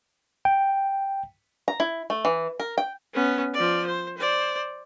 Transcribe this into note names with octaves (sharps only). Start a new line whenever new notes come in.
G5
A#5
E4
A3
E3
A#4
G5
B3 C#4
F3 D5
C5
C5 D5